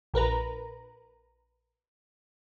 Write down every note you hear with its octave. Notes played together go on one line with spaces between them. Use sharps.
A#1 A#4 B4 A#5